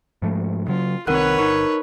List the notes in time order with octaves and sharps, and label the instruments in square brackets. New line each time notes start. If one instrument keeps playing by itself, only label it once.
[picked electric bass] G#2 F3 A3
[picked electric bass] C#3 F#3 [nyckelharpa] F4
[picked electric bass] C2 D#3 C4 [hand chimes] A#4 F#5 F#6 [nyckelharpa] B4 C#5
[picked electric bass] G1 [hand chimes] D#4 A#4 C#6